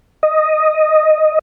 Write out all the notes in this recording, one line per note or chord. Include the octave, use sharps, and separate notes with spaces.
D#5